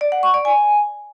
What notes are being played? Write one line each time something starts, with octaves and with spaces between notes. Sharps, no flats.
D5
F#5
C#6
D5
G#5